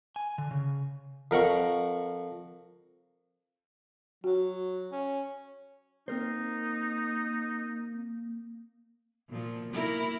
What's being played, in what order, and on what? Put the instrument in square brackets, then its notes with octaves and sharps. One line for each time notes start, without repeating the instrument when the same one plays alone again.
[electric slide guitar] G#5
D3
C#3
[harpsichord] F2 A#4 F#5 C#6
[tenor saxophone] F#3 [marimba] F#4
[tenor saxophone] C#4
[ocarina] A#3 [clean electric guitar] C4 A#4 C5 [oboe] D#4
[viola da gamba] A#2 F3
A#3 E4 A#4